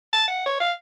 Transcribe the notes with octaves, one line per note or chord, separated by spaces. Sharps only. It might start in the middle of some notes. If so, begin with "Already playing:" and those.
A5
F#5
C#5
F5